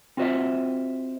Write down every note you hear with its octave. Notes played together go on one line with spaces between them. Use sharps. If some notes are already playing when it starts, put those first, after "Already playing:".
C4 F4 F#4 C5 D#5 E5